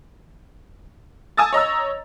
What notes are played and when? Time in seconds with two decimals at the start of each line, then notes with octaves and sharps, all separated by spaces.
1.37 G#5 A5 D#6 E6 A6
1.53 C#5 D#5 A#5 E6